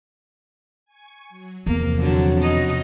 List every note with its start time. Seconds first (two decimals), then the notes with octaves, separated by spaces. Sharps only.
0.85 G#5 C#6
1.29 F#3
1.66 E2 C3 F3 A#3 C4
2.01 D3 F#3
2.41 B2 D#4 D#5